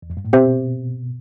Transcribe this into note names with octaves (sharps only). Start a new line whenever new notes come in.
E2
F2
G2
A2
B2 C4 G4 C5 E5